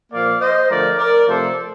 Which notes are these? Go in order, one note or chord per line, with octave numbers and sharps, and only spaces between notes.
A#2 F3 A#3 D5 F5
C5 D#5
D3 F3 A3 A#4 D5
A#4 D5
C3 F3 A3 A4 C5